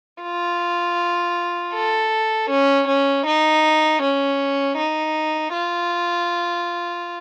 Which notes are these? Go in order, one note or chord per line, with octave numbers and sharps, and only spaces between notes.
F4
A4
C#4
C#4
D#4
C#4
D#4
F4